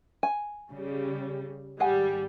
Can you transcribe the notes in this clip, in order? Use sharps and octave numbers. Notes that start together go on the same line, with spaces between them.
G#5
C#3 G3
G#1 G3 G#4 F#5 G#5